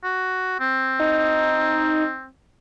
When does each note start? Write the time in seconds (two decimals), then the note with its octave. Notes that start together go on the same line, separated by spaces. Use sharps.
0.04 F#4
0.60 C4
1.00 D#4